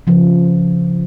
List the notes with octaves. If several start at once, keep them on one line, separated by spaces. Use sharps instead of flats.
C#3 F3